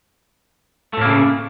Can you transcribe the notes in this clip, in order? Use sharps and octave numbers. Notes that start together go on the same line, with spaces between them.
A2 C#3 A3 A#3